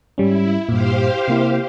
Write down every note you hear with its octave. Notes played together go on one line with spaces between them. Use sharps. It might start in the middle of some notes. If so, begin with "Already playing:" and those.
G#2 G3 C#4 E4
G2 A#2 G4 C5 F5
C3 A#3 E4